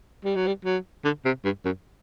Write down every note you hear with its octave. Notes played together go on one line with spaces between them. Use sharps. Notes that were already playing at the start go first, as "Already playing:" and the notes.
G3
F#3
G3
F#3
D3
C3
G2
F#2